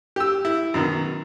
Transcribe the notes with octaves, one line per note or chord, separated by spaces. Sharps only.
G4 E6
E4
F#2 B2 D#3